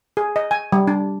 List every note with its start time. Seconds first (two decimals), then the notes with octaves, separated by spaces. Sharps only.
0.17 G#4
0.36 D#5
0.51 G#5
0.72 G3
0.87 D4